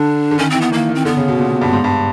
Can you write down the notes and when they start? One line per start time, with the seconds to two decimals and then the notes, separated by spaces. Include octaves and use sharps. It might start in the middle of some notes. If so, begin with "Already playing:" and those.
Already playing: D3 D4
0.31 D3
0.39 D#3 C#4
0.50 E3 C4
0.61 B3
0.72 D#3 A#3
0.89 D#3
0.95 C4
1.05 D3 B3
1.17 C#3
1.28 B2
1.39 A#2
1.61 G2
1.73 G#2
1.84 G2